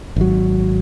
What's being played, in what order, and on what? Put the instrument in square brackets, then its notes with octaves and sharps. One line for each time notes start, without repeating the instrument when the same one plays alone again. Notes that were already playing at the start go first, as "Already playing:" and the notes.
[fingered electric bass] G#1 F#3